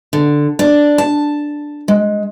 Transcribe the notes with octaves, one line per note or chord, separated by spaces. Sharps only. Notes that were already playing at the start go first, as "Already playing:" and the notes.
D3
D4
A5
G#3